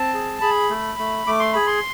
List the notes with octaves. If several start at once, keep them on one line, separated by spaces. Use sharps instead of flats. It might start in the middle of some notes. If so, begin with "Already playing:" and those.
Already playing: C4 A5
G#4
G#4 B5
A3
A3
A3 D6
C6
G#4 B5
C6